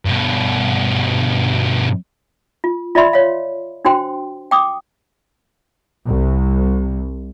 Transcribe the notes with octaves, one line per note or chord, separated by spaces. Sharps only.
G2 B2
F4
F4 D5 E5 B5 C6
C#5 F5
D4 F#4 C5 G5 C6
G5 D6 D#6
C2